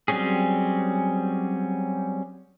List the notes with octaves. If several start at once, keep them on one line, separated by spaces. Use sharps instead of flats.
F#3 G3 C4 C#4 G#4